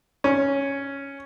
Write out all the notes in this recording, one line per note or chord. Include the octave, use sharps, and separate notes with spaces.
C#4